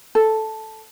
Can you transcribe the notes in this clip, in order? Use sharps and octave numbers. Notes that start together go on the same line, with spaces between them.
A4